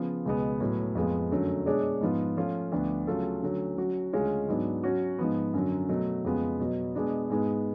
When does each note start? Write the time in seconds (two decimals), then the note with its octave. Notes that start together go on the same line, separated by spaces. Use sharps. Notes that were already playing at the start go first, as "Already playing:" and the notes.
Already playing: C#3 F3 B3 F4
0.26 C#2 B2 G#3 B3
0.61 A2 F#3 B3
0.95 F2 F3 G#3 B3 F4
1.31 F#2 D3 F#3 A3 C#4
1.66 B2 G#3 D4 G#4 C#5
2.01 G#2 F3 B3 F4
2.37 F3 A3 C#4 F4
2.72 D2 D3 F3 B3 D4
3.07 C#3 F#3 A3 F4 A4
3.42 D3 F#3 A3 C#4
3.77 F#3 C#4 F#4
4.13 D2 C#3 G#3 C#4 F4
4.48 G#2 F#3 B3 D4
4.84 F#3 C#4 F#4
5.19 G#2 F3 B3
5.54 F#2 D3 F#3
5.89 B2 F#3 A3
6.24 F2 C#3 G#3 B3 F4
6.60 B2 F#3 B3
6.95 B2 G#3 B3 D4
7.30 G#2 G#3 B3